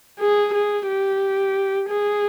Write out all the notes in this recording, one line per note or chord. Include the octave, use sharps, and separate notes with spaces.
G#4
G#4
G4
G#4